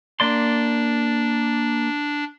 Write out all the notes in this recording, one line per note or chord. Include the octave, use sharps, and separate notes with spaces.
A#3 D4 D5 C6